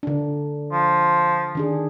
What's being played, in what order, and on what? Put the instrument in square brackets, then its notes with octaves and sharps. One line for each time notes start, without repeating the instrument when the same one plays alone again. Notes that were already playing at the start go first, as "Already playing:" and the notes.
[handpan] D3 D4
[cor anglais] F3
[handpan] D#3 D4 G#4